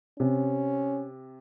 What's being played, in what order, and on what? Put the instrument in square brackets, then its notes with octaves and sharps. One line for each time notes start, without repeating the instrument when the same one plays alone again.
[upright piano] C3 [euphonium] C#4